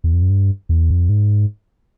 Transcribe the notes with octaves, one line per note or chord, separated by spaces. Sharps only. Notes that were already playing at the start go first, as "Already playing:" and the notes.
E2
F2
F#2
G2
E2
F2
G#2